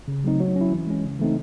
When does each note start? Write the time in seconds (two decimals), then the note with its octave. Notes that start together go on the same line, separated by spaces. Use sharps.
0.08 C#3
0.24 F#3 A3 C4 D#4
0.40 F#3
0.56 C#4
0.61 E4
0.72 E3
0.87 G#3 C#4
1.04 C#3
1.19 E3 A3 C4 D#4